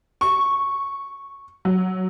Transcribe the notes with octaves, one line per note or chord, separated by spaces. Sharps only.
C#6
F#3